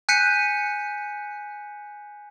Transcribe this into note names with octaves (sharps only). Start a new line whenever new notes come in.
G#5 F#6 G6 B6 C#7 D#7